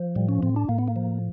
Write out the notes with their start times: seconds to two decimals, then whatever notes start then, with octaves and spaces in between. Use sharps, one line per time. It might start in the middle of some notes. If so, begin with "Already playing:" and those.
Already playing: F3
0.16 A2 G3
0.29 C#4
0.43 A2 C4
0.56 D4
0.69 A2 A#3
0.78 B3
0.88 A#3
0.96 F3